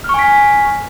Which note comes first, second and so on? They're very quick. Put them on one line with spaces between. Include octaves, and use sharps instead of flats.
F6 C#6 G#5 B6